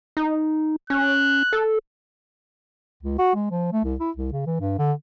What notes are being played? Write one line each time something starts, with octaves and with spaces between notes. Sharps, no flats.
D#4
C#4 F#6
A4
C#2
F#4
G#3
F3
A3
C2
E4
C2
C#3
E3
G2
D3